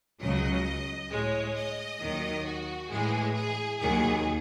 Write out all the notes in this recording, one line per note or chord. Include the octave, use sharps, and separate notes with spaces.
C#2 C#3 F#3 D#5
A2 G#3 C#5
D#5
D#2 D#3 F#3
F#4
A2 E3 G#3 G#4
G#4
D#2 D#3 F#3 G#4